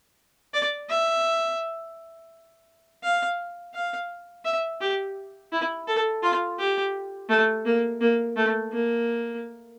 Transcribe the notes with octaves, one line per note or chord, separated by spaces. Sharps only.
D5
E5
F5
F5
E5
G4
E4
A4
F4
G4
A3
A#3
A#3
A3
A#3